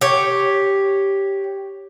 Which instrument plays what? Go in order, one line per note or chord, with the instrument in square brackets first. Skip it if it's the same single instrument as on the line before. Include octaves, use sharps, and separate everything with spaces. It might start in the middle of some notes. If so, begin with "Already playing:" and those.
[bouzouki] G4 C#5